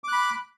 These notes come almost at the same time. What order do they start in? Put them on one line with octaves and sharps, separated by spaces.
D6 F#6 B5